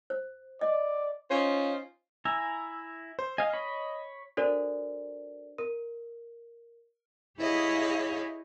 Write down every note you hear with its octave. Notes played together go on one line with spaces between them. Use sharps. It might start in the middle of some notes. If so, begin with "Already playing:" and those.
C5
D5 D#5
C#4 D#4 F4 C5
E4 G#5 A#5 E6
C5
D#5 F5 G#5
C#5 B5
D4 F#4 A4 A#4 C5 D5
A#4
E4 G4 G#4 C#5 D#5 F5